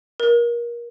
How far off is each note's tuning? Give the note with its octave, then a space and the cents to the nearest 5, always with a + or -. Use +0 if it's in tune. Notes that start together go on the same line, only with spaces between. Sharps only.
A#4 +25